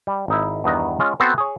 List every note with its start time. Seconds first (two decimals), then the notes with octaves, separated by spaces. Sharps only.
0.07 G3
0.28 G#1 D#4 E4
0.64 E2 G2 D#3 B3 D#5 A#5
0.99 G#3 C#4 F4
1.20 B3 C4 F#4 A4 C5
1.38 G#4 C#5